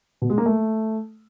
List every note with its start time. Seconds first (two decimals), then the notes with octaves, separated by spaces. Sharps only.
0.22 B2
0.30 G#3
0.38 A#3
0.46 A3